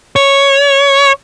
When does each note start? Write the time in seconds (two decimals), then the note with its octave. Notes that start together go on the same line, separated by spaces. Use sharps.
0.16 C#5